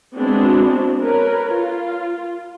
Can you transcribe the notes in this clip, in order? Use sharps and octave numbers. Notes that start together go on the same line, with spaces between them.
G#3 B3 C4 D4 E4 F#4
A#4 B4 C#5
F4